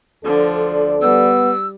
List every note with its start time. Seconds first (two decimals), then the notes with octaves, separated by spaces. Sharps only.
0.24 D2 D3 F3 A4 D5
1.02 G3 B3 E6